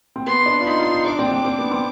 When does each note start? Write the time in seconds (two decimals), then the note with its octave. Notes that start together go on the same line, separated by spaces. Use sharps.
0.16 C4
0.26 B3 C6
0.46 D4
0.60 F4
0.66 D#4 C6
0.79 F4
0.92 D#4
1.05 D4 D6
1.19 C4
1.27 D4
1.31 C4
1.45 C4
1.59 B3
1.71 C4